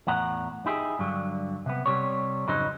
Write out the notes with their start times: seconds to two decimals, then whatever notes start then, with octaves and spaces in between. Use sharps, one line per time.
0.07 E2 A2 F#5 A#5
0.66 D#4 E4 G4 G#4
0.99 G2 D3 F#3
1.66 C3 B3
1.86 C2 C3 G3 C#5
2.47 F2 G#2 C#3 F#3 D#4 C5